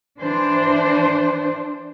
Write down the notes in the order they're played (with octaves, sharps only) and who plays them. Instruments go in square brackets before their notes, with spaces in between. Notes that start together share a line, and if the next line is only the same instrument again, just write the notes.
[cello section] E3 D4 C5